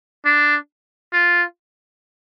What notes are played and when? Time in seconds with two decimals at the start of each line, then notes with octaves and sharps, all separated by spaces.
0.25 D4
1.13 F4